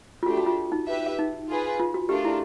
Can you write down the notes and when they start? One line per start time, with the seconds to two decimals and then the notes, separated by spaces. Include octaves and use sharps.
0.23 F4
0.26 A3 D4 F#4 G4
0.37 F#4
0.46 F4
0.72 D#4
0.87 G4 B4 E5
1.19 D#4
1.48 F4 G#4 B4
1.80 F4
1.94 F#4
2.09 A3 D4 F4 G4 A#4
2.25 E4